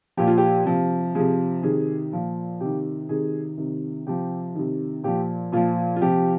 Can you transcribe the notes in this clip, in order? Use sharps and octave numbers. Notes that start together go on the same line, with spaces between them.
A#2 F3 G4
F4
G4
C3 F3
C3 F3 G#4
C3 D#3 G#4
A#2 F3
C3 D#3 G4
C3 D#3 G#4
C3 D#3
C3 F3 G4
C3 D#3
A#2 F3 G4
A#2 F3 F4
F4
C3 F3 G4